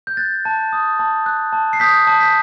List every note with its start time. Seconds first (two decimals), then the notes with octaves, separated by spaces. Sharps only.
0.07 G6
0.17 F#6 A6
0.45 A5
0.73 D#6
0.99 A5
1.26 F#6
1.53 A5
1.73 C7
1.80 D#6 G6 B6
2.07 A5
2.20 G6 B6